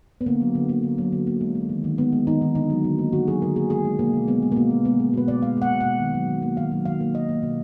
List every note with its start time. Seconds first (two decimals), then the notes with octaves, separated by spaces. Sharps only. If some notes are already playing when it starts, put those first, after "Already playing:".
0.21 B3
0.26 D3 A#3
0.41 F#3
0.55 D3
0.69 A#3
0.83 D3
0.98 F#3
1.12 D3
1.27 A#3
1.41 G#3
1.55 G#3
1.69 D#3
1.84 D#3
1.98 G#3 B3
2.13 G#3
2.27 D#3 D#4
2.41 D#3
2.55 D3 D#4
2.70 F#3
2.84 D3
2.98 A#3
3.13 D3 F#4
3.27 F#3 G#4
3.42 D3 A#4
3.56 A#3 G#4
3.70 G#3 G#4
3.85 G#3
3.99 B2 A#3
4.14 B2
4.28 G#3 B3
4.42 G#3
4.52 A#3
4.56 B2 B3
4.70 B2
4.85 G#3 B3
5.00 G#3
5.13 B2 B4
5.28 B2 D5
5.42 G#3 F5
5.57 G#3 F#5
5.71 B2
5.81 F#5
5.86 B2
6.00 D#3
6.14 F#3
6.28 D#3
6.42 A#3
6.57 D#3 F5
6.72 F#3
6.85 D#3 F5
7.00 A#3
7.14 A#3 D#5
7.29 A#3
7.43 B2